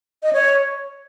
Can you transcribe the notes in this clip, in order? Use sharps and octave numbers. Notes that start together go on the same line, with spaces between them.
D#5
C#5